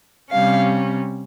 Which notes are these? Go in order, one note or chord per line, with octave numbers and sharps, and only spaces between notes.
C3 G3 C#4 F5